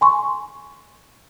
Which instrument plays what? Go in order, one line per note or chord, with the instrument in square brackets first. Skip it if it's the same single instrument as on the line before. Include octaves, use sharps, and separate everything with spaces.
[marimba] G#5 C6 C#6